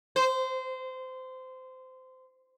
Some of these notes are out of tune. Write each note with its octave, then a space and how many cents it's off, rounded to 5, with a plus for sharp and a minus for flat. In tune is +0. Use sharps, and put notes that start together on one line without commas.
C5 -20